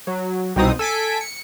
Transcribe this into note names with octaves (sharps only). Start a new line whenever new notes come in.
F#3
C2 B2 C4 D#4 D#6
A4 G#5 B6 D7
C#7